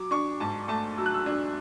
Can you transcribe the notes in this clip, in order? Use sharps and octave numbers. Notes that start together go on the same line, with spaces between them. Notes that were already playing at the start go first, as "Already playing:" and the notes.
Already playing: F#3 D6
D4 C#6
G#2 A5
A3 A5
F#3 E6
F#6
E6
D4